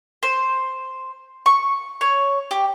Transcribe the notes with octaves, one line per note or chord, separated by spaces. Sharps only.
C5
C#6
C#5
G4